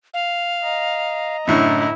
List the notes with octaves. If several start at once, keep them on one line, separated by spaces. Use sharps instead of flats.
F5
D#5 A#5
F#2 A2 D3 E4